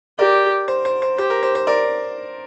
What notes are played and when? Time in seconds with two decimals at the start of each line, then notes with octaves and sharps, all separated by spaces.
0.19 G4 A#4 D5
0.68 C5
0.85 C5
1.02 C5
1.18 G4 C5
1.30 A#4
1.43 C5
1.55 C5
1.67 A#4 D5